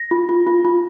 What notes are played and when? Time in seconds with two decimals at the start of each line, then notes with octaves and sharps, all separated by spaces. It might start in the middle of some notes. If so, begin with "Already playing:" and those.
Already playing: A#6
0.11 F4
0.29 F4
0.47 F4
0.65 F4